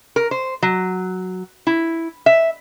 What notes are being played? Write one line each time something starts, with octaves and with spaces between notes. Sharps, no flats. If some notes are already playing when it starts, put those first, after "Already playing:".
A#4
C5
F#3
E4
E5